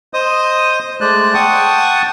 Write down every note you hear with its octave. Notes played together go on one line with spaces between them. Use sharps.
C5 D#5 D#6
G#3 A3 C5 D5 F#6
F#5 G5 A5 C#6 D#6